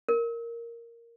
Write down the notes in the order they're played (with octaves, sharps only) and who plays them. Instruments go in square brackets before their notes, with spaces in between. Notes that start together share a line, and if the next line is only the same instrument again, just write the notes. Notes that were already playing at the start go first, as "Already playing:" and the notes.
[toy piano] A#4